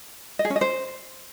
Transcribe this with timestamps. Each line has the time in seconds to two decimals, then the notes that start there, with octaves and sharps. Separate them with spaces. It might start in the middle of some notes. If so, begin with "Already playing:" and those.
0.39 D#5
0.45 G#4
0.50 C#4
0.56 D#5
0.61 C5